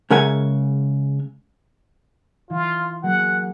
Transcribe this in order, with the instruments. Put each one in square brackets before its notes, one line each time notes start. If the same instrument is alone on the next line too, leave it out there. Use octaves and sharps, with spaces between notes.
[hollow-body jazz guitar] C#3 G#3 A#4 E5 F#5 G#5
[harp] E3 [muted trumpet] F4
[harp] F#3 A#3 G#4 [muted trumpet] F#5